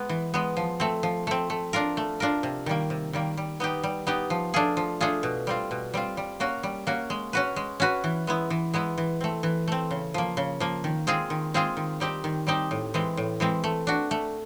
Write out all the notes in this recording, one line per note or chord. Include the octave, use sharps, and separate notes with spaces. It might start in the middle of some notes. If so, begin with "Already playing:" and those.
Already playing: G#3 B3
E3
G#3 B3
F3
A3 C4
F3
A3 C4
A3
D4 F4 A#4
A3
D4 F4 A#4
C3
D#3 G3 A#3
C3
D#3 G3 A#3
G3
B3 D#4 G4
G3
B3 D#4 G4
F3
A3 D4 F4 G#4
F3
A3 D4 F4 G#4
B2
G3 C4 F4
B2
G3 C4 F4
G3
A#3 C#4 F#4
G3
A#3 C#4 F#4
G#3
C#4 F#4 B4
G#3
C#4 F#4 B4
E3
G#3 B3 E4
E3
G#3 B3 E4
E3
A3 C4
E3
A3 C4
C#3
F3 A#3
C#3
F3 A#3
D#3
G#3 C4 F4 G#4
D#3
G#3 C4 F4 G#4
D#3
G3 C4 D#4 G4
D#3
G3 C4 D#4 G4
A2
E3 G#3 C4
A2
E3 G#3 C4
A3
D4 F#4
A3